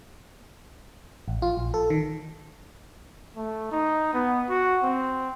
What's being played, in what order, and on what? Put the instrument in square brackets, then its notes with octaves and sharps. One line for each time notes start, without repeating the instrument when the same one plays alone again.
[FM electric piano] A1
F4
A#1
A4
D#3
[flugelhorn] A3
D#4
B3
F#4
C4